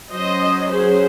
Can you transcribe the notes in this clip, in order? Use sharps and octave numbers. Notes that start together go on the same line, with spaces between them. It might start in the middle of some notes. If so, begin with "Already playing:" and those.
F#3 C#4 C5 D#5
G#4 C5